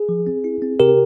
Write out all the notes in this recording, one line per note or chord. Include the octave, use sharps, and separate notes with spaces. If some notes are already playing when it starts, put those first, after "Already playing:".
Already playing: G#4
F3
C4
E4
C4
C3 G4 A#4